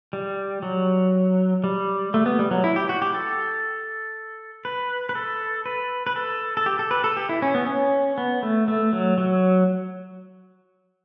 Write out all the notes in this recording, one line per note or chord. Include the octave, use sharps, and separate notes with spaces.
G3
F#3
G3
A3
B3
G3
F#3
E4
G4
F#4
G4
A4
B4
B4
A4
B4
B4
A4
A4
G4
A4
B4
A4
G4
E4
C#4
B3
C#4
B3
A3
A3
F#3
F#3